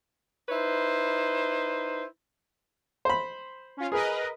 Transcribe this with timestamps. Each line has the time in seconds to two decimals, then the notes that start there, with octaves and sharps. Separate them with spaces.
0.49 D#4 E4 B4 C5
3.05 C5 B5
3.77 C#4 F4
3.92 G#4 A#4 B4 D#5